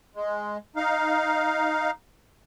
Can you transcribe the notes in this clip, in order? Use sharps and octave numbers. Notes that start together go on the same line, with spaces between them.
G#3
D#4 F5